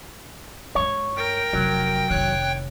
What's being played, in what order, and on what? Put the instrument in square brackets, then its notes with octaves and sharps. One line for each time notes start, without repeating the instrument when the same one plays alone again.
[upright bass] G2 G#3 [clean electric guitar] C#5
[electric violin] A#4 [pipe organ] G5
[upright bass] F1 D#4 [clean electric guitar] F#3
[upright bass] F1 D#3 [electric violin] C#5 F#6